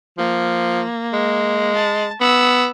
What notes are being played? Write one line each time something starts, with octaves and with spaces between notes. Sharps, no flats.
F3 A#3
G#3
A5
B3 E6